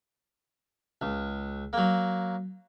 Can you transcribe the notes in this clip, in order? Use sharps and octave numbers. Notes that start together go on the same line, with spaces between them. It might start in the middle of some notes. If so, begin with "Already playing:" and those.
C#2
F#3 A#3